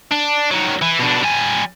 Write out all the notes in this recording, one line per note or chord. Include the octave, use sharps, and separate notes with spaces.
D4
D#3 F#3
E3
B2 D4
G3 G#5